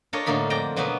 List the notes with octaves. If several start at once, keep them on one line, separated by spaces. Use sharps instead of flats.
D4 F4 A4 A#4 C#5 D#5
A2 D3 A#3 D#4 B5
F2 D5 G5 A#5
B2 F#3 A#3 B3 D#4 B4